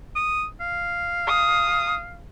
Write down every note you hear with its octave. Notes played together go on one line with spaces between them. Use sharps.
D#6
F5
D#6